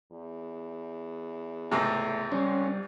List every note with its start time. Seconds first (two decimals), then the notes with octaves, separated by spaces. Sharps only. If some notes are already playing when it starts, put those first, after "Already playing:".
0.12 E2
1.71 C#2 G#2 C3 A3
2.32 G3 C4 C#4